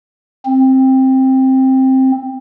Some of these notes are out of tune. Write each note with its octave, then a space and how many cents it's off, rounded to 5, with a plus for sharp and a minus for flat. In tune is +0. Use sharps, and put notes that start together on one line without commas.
C4 +10